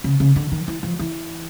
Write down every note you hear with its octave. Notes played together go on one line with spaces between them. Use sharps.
C#3
C#3
D3
D#3
E3
F3
E3